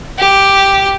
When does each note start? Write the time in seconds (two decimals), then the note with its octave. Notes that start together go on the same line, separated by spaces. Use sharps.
0.18 G4